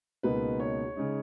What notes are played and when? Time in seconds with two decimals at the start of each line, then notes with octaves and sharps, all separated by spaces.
0.23 C#2 B2 A#3 D#4 B4
0.60 C#5
0.96 C#3 G#3 D#4